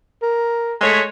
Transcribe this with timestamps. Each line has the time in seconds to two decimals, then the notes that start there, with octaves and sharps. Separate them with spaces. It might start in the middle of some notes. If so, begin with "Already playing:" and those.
0.23 A#4
0.81 G#3 A3 C#5